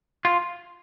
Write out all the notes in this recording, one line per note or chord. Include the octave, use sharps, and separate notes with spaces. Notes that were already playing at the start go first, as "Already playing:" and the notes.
F4